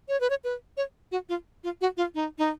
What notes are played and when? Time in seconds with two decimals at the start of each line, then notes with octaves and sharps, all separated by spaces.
0.09 C#5
0.21 B4
0.30 C#5
0.44 B4
0.77 C#5
1.12 F#4
1.29 F4
1.64 F4
1.81 F#4
1.97 F4
2.15 D#4
2.38 D#4